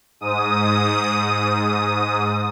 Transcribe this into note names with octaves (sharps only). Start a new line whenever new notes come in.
G#2 D#6